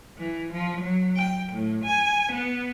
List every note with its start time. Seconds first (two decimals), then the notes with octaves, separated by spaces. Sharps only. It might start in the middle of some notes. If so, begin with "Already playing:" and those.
0.19 E3
0.53 F3
0.81 F#3
1.16 G5
1.53 A2
1.84 G#5
2.32 B3